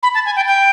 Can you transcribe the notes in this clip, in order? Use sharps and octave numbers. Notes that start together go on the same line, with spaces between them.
B5
A5
G#5
G5
G5